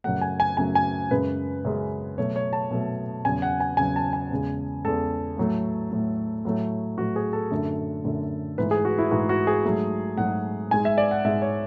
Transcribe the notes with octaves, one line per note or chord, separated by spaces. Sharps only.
F#2 C#3 F#3 A3 F#5
G#5
G#5
F#2 C#3 F#3 A3 G#5
G#5
F#2 C#3 G#3 B4
F#2 C#3 G#3
B2 F#3 A3 C#5
C#5
A5
B2 F#3 A3
E2 C#3 F#3 G#5
F#5
G#5
E2 C#3 F#3 G#5
A5
G#5
E2 C#3 G#3
E2 C#3 G#3 A4
A2 F#3 A3
A2 F#3 A3
A2 F#3 A3
A2 F#3 A3 F#4
G#4
A4
F#2 D3 A3
F#2 D3 A3
G#2 E3 A3 B4
G#4
F#4
E4
G#2 E3 A3 F#4
F#4
G#4
G#2 F#3 A3
G#2 F#3 A3 F#5
G#2 G#3 G#5
E5
D5
F#5
G#2 G#3 E5
C#5